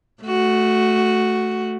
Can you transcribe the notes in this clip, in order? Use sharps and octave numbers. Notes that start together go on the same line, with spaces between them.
A3 F#4